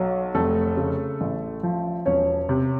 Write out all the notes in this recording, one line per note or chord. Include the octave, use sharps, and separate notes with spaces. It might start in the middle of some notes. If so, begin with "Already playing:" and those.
Already playing: B1 F#3
F1 A3 A4
C#3
A1
F3
E1 C#4 C#5
C3